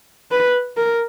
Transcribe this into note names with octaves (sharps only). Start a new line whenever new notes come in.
B4
A#4